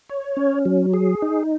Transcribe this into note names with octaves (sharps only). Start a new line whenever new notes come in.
C#5
C#4
F#3
G#4
D#4